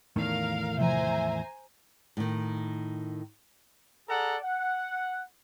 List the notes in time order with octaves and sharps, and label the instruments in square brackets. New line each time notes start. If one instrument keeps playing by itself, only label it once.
[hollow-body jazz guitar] E2 A2 D#3 [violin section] A#4 F5
[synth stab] C3 F3 [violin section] C5 G#5 A#5 [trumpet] E5
[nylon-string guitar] A2 D#3
[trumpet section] G#4 A4 D5 F#5 A#5
F#5